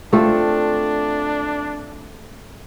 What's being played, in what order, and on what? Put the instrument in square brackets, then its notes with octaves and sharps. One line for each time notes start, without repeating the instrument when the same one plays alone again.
[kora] A3 C4 F4 A4 [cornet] D4